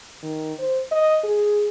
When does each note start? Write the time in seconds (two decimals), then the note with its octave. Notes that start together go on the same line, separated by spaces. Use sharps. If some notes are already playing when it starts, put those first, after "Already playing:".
0.22 D#3
0.59 C5
0.91 D#5
1.24 G#4